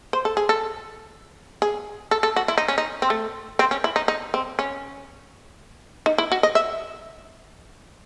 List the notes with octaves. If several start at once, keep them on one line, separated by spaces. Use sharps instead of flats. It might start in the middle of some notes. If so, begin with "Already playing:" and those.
C5
A4
G#4
A4
G#4
A4
A4
F#4
E4
D#4
C#4
D#4
C4
A3
C4
C#4
E4
D#4
D#4
C4
C#4
D#4
E4
F#4
D#5
E5